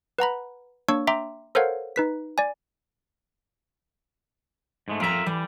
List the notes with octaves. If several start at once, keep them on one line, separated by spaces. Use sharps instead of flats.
B4 F#5 A#5 B5
A#3 D4 C#5 C#6 E6
E5 G5 A#5 C6 D6
A4 A#4 C5 C#5 F5 F#5
D#4 B4 B6
D5 G#5
G#2 G#3 A3
F2 F4 A#4 E5 A#5
E3 G3